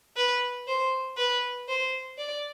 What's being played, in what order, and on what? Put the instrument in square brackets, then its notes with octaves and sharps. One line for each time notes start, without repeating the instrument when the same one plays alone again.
[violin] B4
C5
B4
C5
D5